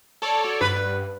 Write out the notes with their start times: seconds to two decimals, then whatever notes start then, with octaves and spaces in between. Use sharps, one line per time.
0.22 A4 C#5 D5 A5
0.44 F#4
0.61 G2 B4
0.76 F#5